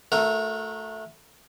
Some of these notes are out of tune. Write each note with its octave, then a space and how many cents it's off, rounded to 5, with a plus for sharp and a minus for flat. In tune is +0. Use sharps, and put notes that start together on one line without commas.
A3 +0 F#4 -35 A#4 -5